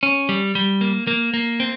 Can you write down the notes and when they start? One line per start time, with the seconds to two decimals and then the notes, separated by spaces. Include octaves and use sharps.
0.03 C#4
0.29 G3
0.55 G3
0.81 A#3
1.07 A#3
1.34 A#3
1.60 C4